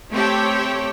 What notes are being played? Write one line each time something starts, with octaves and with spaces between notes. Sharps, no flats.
A3 C4 G4 A4 C#5 G5